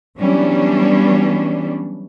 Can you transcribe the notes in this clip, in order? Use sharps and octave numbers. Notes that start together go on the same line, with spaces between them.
E3 F#3 G3 B3 C#4 D4